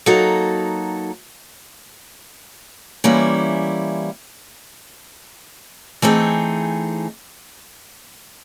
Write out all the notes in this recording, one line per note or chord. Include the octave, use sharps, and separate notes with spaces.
F#3 A#3 D#4 F#4 A4
E3 G3 A#3 C#4 E4
E3 A3 C4 D#4 G#4